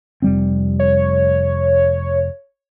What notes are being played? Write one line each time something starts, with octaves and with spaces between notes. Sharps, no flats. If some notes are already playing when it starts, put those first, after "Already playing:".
F1 G3 C4
C#5